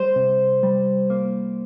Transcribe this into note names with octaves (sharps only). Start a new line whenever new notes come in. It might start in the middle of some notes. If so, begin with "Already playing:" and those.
Already playing: G3 C5
C3
G3
A#3